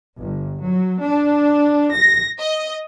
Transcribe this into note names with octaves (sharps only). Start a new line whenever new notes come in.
G1
F#3
D4
A#6
D#5